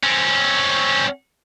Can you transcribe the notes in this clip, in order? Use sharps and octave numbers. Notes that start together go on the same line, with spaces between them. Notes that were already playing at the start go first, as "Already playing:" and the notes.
C4 C#4